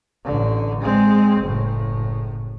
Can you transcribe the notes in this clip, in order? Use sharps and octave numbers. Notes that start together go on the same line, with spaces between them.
A1 D3
G#3 C4
F#1 A2